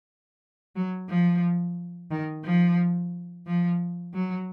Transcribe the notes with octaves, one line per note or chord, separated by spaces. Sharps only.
F#3
F3
D#3
F3
F3
F#3